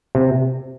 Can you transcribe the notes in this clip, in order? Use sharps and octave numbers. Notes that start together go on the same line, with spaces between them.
C3